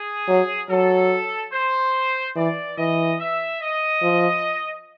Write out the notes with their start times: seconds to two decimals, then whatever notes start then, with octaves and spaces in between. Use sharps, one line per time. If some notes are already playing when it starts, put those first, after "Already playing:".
Already playing: G#4
0.28 F#3
0.70 F#3 A4
1.52 C5
2.36 E3 D5
2.78 E3 D#5
3.19 E5
3.61 D#5
4.02 F3